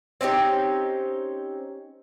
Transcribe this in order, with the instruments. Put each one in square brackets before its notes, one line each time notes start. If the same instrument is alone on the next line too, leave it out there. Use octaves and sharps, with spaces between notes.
[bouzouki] C4 C#4 D#4 G4